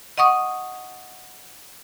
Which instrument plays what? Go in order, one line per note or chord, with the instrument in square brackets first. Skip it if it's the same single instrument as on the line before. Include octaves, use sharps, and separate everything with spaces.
[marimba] D#5 F#5 C#6 D#6